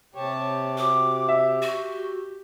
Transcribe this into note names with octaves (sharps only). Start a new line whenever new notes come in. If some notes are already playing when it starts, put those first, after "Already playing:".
C3 G4 C#5 A5
F#4 D6
E5
F#4 G4